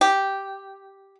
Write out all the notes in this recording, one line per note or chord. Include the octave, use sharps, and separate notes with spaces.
G4